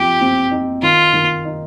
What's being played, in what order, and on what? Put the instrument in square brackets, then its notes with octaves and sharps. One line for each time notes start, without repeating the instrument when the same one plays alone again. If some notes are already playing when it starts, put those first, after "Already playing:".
Already playing: [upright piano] F3 C4 [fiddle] G4
[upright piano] C4
D#4
[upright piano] D#3 [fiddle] F4
[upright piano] D#3
D#4